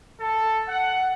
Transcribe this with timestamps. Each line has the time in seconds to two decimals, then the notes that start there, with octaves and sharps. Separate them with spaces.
0.20 A4
0.68 F#5